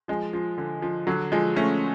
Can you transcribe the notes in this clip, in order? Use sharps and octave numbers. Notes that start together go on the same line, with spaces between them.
F3 G#3
F3
D3
F3
D3 F#3
F3 G#3
A3 C#4